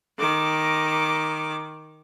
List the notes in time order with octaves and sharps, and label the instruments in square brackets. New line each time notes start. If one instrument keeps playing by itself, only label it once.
[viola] D#3 D6